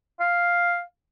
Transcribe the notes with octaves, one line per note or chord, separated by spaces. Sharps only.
F5